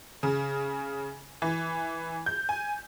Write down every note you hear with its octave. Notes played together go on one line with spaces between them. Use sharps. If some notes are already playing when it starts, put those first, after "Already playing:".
C#3
E3
G6
G#5